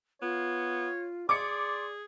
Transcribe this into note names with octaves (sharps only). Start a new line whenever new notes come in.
B3 F4 C#5
G#4 D5 C6 D6 C#7